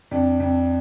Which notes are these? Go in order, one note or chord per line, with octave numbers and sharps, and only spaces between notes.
F2 D4
F2